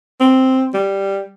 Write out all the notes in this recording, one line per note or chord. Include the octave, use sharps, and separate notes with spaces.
C4
G3